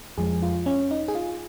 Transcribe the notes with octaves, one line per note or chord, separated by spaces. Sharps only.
F2 F3 G#3 G#4
F4
C#4
D#4
G#4
F4